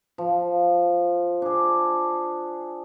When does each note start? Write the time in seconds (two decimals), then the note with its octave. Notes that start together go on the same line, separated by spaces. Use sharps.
0.18 F3
1.42 D4 G#4